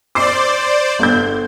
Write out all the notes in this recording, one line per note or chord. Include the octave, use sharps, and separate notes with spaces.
C5 D5 D6 C7
G1 G6